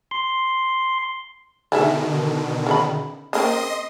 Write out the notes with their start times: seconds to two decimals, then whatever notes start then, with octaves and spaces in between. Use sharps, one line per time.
0.11 C6
1.72 B2 D3 D#3 A3 G#4 E5
2.67 C#3 F4 B5
3.33 C#3 A#3 C4 D#5 C6 D#6